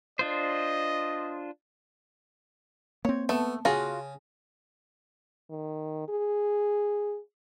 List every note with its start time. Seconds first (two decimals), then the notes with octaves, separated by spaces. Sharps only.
0.19 D4 F4 C5 D#5
3.05 A#3 C4 C#5
3.29 A3 B3 A5
3.65 C#3 F4 F#4 G#4 G#5 A#6
5.50 D#3
6.08 G#4